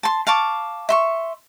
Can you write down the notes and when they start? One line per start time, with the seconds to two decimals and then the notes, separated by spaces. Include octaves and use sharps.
0.03 A5 C6
0.27 F5 A5 C#6 D6
0.89 E5 C6 C#6